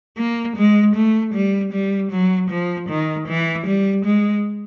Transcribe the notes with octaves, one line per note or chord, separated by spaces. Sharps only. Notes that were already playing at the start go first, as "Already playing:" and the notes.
A#3
G#3
A3
G3
G3
F#3
F3
D#3
E3
G3
G#3